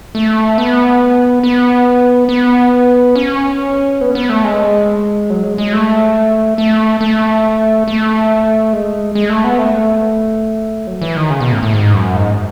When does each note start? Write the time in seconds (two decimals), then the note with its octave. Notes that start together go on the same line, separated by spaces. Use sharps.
0.15 A3
0.58 B3
1.43 B3
2.29 B3
3.16 C#4
4.01 B3
4.15 B3
4.29 A3
4.44 G#3
5.30 F#3
5.44 G#3
5.58 G#3
5.73 A3
6.58 A3
7.01 A3
7.88 A3
8.73 G#3
9.15 G#3
9.29 A3
9.44 B3
9.59 A3
10.87 F#3
11.02 E3
11.16 D#3
11.30 C#3
11.40 B2
11.52 A2
11.63 A2
11.73 G#2
11.94 F#2
12.16 G#2